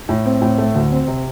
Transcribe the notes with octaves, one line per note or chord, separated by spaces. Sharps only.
A2
C4
A2
A3
D2
C4
C3